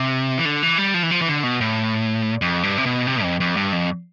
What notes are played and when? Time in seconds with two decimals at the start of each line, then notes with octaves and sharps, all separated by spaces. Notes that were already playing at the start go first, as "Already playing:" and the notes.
Already playing: C3
0.38 E3
0.45 D3
0.63 E3
0.78 G3
0.94 F3
1.03 E3
1.11 F3
1.21 E3
1.28 D3
1.43 B2
1.61 A2
2.42 F2
2.63 G2
2.78 C3
2.86 B2
3.07 C3
3.23 F2
3.40 F2
3.56 G2
3.72 F2